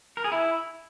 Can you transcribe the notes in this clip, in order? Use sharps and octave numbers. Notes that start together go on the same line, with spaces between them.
A#4
G#4
E4